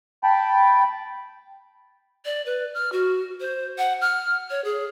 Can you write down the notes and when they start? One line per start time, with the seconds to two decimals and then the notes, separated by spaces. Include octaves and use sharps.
0.23 G5 A5 B5
2.25 D5
2.46 B4
2.74 F6
2.92 F#4
3.40 C5
3.78 F#5
4.01 F6
4.50 C#5
4.65 G#4